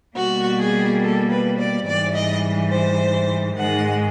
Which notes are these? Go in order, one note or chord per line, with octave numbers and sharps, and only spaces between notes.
B2 G3 A#3 F#4
G#4
A4
B4
D5
G#2 E3 G3 D5
D#5
C5
G#2 D#3 G#3 F#5